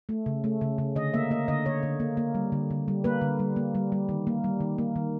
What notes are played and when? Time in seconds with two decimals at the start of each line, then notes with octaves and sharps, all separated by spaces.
0.09 A3
0.26 C#3
0.44 A3
0.61 C#3
0.78 C#3
0.96 D3 D#5
1.14 A#3 E5
1.31 A#3 D#5
1.48 D3 D#5
1.66 D3 C#5
1.83 D3
2.00 A#3
2.17 A#3
2.35 G3
2.52 D3
2.70 D3
2.88 G3
3.04 A#3 B4
3.21 D3
3.39 G3
3.56 A#3
3.75 G3
3.92 G3
4.09 D#3
4.27 A#3
4.44 G3
4.60 D#3
4.78 A#3
4.96 D#3